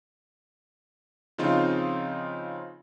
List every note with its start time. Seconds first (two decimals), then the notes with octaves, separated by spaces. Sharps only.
1.38 C#3 F3 C4 D#4 F4